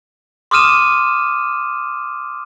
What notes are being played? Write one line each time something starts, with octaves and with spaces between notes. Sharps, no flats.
C6 D6 D#6 F6 D#7 E7